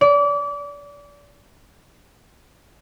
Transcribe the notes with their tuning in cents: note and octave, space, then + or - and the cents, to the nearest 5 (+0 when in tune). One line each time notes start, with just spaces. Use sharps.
D5 -30